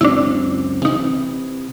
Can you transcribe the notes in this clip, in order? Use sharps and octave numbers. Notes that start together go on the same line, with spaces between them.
C#2 F#2 C4 D4 E4
C3 E3 D#4